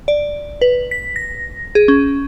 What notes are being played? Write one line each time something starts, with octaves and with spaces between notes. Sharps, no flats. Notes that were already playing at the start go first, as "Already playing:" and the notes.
D5
B4
B6
A#6
G#4
C#4